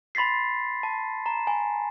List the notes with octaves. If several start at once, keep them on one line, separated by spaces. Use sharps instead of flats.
B5 C6 A6 B6 C7
A5
A#5
G#5